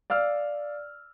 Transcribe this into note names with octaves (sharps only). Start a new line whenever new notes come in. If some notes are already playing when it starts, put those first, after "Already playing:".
D5 F5 E6 F6